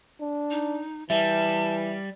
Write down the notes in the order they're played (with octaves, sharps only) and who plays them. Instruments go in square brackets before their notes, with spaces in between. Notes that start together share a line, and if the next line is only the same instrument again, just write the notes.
[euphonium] D4
[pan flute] D#4
[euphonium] E3 [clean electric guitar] G3 [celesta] E5 [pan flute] A5